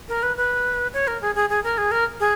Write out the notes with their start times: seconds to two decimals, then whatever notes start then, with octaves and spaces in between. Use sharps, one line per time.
0.09 A#4
0.23 B4
0.37 B4
0.93 C#5
1.07 A#4
1.22 G#4
1.35 G#4
1.50 G#4
1.64 A#4
1.78 G#4
1.91 A#4
2.20 G#4